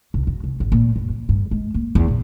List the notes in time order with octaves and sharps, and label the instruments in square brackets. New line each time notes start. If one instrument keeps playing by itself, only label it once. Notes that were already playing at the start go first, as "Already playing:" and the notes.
[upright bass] C2
F#2
C2
G#1
A#2
F#2
A#3
G2
G#3
A#3
E2
A#2